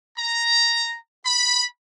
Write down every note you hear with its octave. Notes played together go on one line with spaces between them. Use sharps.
A#5
B5